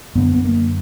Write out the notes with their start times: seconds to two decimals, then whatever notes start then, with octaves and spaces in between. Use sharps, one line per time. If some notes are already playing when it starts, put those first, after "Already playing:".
0.15 F#2 D3 B3
0.34 B3
0.44 A#3